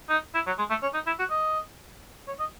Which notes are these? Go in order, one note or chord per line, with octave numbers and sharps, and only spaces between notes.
D#4
E4
F#3
G#3
A3
C#4
D#4
E4
F#4
D#5
C#5
D#5